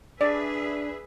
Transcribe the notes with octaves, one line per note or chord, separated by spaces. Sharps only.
D4 G#4 B4 D5 E5